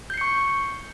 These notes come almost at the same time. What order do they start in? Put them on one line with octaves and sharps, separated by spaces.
G6 C7 C#7 C#6